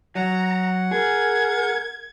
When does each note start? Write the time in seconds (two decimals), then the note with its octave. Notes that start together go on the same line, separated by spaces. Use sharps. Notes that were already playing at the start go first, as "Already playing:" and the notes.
0.15 F#3 F#5 A#5
0.91 G#4 A#4 G#6